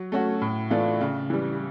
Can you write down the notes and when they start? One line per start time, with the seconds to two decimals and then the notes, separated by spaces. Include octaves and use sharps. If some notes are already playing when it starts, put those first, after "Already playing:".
Already playing: F#3
0.12 A3 C#4 F#4
0.42 A2
0.70 E3 A3 D4 F4
1.01 C#3
1.30 E3 G3